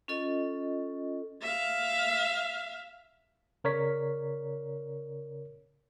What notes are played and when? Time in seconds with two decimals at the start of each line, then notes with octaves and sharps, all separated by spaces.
0.08 C#4 F4 A4 D#5
1.42 E5 F5
3.64 C#3 A#4 C#5 D5 B6